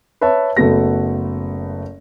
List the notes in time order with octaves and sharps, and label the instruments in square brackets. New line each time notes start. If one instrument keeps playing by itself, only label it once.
[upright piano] B4 C#5 E5 A5
F#1 A3 B3 F#4 A#6